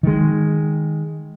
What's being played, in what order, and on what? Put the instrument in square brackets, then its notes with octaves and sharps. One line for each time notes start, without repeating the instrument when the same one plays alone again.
[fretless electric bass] D#3 G#3